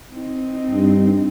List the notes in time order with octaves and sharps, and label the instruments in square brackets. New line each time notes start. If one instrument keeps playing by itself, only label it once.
[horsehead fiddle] C4 D#4
[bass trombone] G2